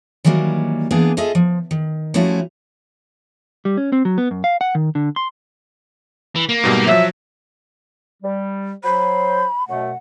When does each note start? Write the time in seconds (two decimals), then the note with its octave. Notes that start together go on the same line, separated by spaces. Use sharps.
0.24 D#3 E3 F#3 G3 A#3
0.91 E3 A#3 B3 D4 G#4
1.17 F4 G#4 A4 D#5 E5
1.35 F3
1.71 D#3
2.14 F3 G3 A3 C#4 E4 F#4
3.65 G3
3.77 C#4
3.92 C4
4.05 F#3
4.18 B3
4.31 F#2
4.44 F5
4.61 F#5
4.75 D#3
4.95 D3
5.16 C6
6.36 E3
6.49 A#3
6.64 G#2 B2 G3
6.87 F3 F#3 E5
8.23 G3
8.84 F#3 C5 B5
9.68 F#2 B2 A3 F#5